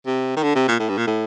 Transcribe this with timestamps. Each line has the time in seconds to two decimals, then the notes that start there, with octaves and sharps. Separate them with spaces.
0.06 C3
0.36 D#3
0.43 D3
0.55 C3
0.68 A#2
0.79 A2
0.89 G2
0.97 A#2
1.07 A2